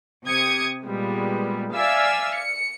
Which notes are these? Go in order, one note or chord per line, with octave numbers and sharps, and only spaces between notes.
C3 G4 D#6 G#6 C#7
A#2 G3 G#3 B3
D5 E5 F5 G#5 D6 E6
C#7